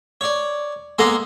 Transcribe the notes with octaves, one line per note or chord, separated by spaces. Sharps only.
C#5 D5
G#3 A#3 B3 A4 A#5 C6